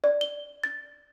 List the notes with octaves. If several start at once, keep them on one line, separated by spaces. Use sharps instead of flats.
D5
G7
A6